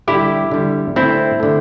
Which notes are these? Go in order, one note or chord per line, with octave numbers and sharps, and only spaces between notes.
D3 G3 E4 G4
D3 G3
D3 A3 C4 E4
D3 A3